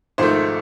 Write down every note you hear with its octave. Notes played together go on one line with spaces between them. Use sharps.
G#1 G#2 F3 A3 C5